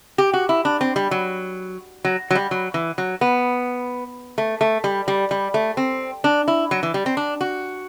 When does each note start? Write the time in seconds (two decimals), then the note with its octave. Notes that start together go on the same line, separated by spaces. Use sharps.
0.18 G4
0.34 F#4
0.49 E4
0.65 D4
0.81 C4
0.96 G3
1.11 F#3
2.05 F#3
2.31 F#3
2.35 G3
2.51 F#3
2.74 E3
2.98 F#3
3.21 B3
4.38 A3
4.61 A3
4.84 G3
5.08 G3
5.31 G3
5.54 A3
5.77 C4
6.24 D4
6.48 E4
6.71 F#3
6.83 E3
6.94 G3
7.06 C4
7.17 D4
7.41 F#4